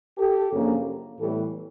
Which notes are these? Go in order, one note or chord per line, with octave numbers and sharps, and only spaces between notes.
G4 A4
F#2 C#3 F3 A#3 D4
A2 E3 G3 B3 G4 A4